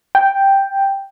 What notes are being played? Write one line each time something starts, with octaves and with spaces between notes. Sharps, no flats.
G5